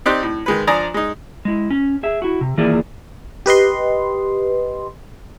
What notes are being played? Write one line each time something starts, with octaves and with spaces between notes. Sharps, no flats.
C4 D#4 G4 C5 D5 F#6
A2
D#3 G#3 B4
F3 D4 D5 G#5 A#5 D#6
G#3 D#4
G#3 E4
C#4
G#4 E5
E4 F#4
C3
D#3 E3 A#3 F4 G#4 D5
G4 B4 D#5 C6